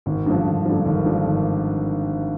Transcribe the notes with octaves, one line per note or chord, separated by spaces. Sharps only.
G#1
G2 D3 F3
G#1
G2 D3 F3
G#1
G2 D3 F3
G#1